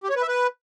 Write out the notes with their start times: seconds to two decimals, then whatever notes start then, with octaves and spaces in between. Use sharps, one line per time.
0.04 G4
0.10 C#5
0.16 B4
0.22 E5
0.28 B4